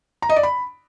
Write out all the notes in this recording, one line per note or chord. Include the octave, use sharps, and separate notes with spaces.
A#5
D#5
D5
B5